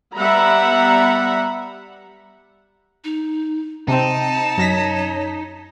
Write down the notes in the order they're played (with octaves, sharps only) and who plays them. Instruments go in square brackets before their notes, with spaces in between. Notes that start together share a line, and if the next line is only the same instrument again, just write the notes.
[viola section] G3 B3 E5 F#5 A#5 B5
[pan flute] D#4
[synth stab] C3 C4 [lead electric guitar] D#4 [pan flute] G5 [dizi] A5
[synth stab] F#2 A#6 B6 [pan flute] C#5